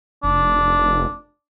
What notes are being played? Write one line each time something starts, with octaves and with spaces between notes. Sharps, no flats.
F1 D4